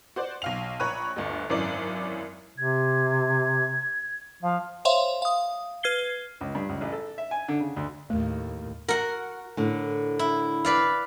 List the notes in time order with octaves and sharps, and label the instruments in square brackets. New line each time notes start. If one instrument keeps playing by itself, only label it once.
[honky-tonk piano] F#4 C5 D5
B1 F5 F7
A#1 C#5 A#5 B5 F#6 D#7
G1 D2
G#1 F#2 E3 C#4 D5
[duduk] C3 [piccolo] G#6
[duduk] F3 [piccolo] F5
[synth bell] C5 C#5 E5 F5 C6
F5 D#6
B4 F6 G#6 C7 G7
[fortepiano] C#2
G2
C#2
A1
A4
E5
G#5
D3
C#3
D2
[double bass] D#2 A2 [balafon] A3
[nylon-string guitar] F#4 [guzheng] A#4 F#5
[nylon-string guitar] A2 D3
[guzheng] E4
B4 D5 F5